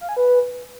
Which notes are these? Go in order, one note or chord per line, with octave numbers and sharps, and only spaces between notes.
F5
G#5
B4